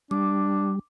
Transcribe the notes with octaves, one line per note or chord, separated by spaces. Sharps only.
G3 D4 D6